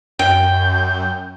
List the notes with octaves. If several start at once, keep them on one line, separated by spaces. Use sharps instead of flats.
F#2 G5 G6